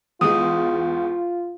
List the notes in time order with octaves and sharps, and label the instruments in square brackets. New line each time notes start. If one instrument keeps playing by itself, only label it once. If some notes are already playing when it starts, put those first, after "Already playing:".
[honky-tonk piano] E2 G#3 [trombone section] F4 [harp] D#6